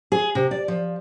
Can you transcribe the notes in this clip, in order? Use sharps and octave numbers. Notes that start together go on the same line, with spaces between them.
G#4
C3
D5
F3